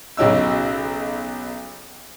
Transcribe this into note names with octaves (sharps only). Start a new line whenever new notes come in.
B1 C#3 F#3 D#4 E6